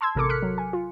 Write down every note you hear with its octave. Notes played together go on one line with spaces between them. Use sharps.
A5 C6 E6 G#6
A1 C3 A4 A#4 D6 C#7
D6 F6 F#6 B6 C#7
F#3
G#5
F4